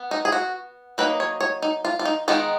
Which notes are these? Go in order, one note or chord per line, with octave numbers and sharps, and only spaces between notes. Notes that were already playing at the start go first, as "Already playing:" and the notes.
Already playing: B3
D#4
G#4
F#4
F#3 A#3 D#4 B4
C#5
C#5
D#4
F4
F4
D#4
D#3 G#3 B3 D#4 F4